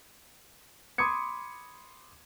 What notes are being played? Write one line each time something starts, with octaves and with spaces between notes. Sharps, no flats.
B5 C6 D6 D#6 G#6 C#7